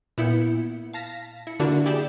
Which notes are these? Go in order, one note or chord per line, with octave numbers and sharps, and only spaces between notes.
A#2 B3 E4 G6 C#7
F5 A5 A#6 B6
E4 C#7
D3 A#3 D4 E4 F#4
E4 G4 G#4 D5 G6 E7